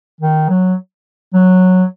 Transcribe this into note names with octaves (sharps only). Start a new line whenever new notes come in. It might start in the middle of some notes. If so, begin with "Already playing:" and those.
D#3
F#3
F#3